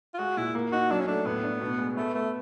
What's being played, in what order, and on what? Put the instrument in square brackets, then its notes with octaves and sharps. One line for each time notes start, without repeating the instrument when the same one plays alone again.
[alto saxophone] F4
[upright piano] G#3 [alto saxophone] F#4
[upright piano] A#2 [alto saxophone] E4
[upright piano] A#3
[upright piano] D#4 [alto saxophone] F#4
[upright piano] F#3 [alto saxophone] D4
[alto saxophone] C#4
[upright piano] A3 [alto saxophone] D4
[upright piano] A2 [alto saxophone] B3
[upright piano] D4
B2
G#3
[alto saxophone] A3 [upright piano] B3
[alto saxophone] A3 [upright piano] B3